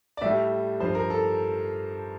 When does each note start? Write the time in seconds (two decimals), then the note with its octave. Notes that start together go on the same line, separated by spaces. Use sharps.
0.17 D5
0.21 A2 G3 E5
0.80 G2 F3 C5
0.95 A#4
1.10 A4